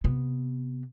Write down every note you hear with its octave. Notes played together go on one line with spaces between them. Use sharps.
C3 B3